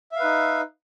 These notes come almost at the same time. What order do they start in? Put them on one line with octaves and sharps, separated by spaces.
E5 F5 B4 D#4